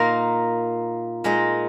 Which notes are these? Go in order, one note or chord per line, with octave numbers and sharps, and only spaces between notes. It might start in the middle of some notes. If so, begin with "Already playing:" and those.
Already playing: A#2 A#3 D#4
A#2 G#3 D#4